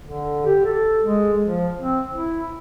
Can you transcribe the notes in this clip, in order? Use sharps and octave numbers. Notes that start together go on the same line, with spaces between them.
D3
G4
A4
G#3
F3
C4
E4